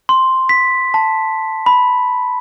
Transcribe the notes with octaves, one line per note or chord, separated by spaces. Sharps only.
C6
B6
A5
B5